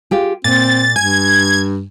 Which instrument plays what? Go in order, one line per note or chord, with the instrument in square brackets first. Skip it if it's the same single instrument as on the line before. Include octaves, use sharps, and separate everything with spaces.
[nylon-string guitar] F4 G4 G#4
[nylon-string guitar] A#2 [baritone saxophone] C4 [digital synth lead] A6
[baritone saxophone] G2 [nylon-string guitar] G#5 [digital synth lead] G#6